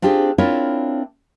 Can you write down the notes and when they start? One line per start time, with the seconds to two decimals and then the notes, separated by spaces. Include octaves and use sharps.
0.02 C4 D4 F4 G4 G#4 C5
0.38 C4 D4 E4 F4 A#4 C#5